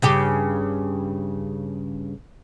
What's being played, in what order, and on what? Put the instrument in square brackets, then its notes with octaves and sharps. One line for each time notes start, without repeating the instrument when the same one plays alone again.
[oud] G2 C#3 G4